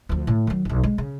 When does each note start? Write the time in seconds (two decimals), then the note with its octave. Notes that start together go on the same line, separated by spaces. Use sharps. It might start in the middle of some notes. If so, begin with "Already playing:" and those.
0.09 D2 F3
0.27 A2
0.47 D#3 F#3
0.65 E1 B1
0.83 G#3
0.98 C#3